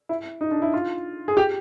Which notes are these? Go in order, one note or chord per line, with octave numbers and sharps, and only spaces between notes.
E4
D#4
D4
E4
F4
G#4
G4